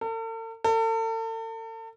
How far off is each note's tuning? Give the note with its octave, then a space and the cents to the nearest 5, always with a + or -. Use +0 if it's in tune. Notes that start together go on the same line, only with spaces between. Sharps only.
A4 +45
A4 +40